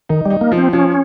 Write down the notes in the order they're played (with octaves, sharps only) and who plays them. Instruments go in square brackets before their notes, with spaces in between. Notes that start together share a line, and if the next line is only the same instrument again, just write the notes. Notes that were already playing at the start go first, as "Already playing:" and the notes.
[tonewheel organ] D#3 [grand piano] D#4
[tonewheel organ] G3 [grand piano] D#4
[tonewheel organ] A#3
[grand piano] F3
[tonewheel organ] C4
[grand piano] F3 [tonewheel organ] C#4